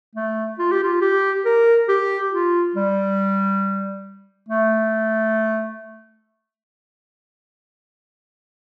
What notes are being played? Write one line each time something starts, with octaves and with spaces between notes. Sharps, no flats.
A3
F4
G4
F4
G4
A#4
G4
F4
G3
A3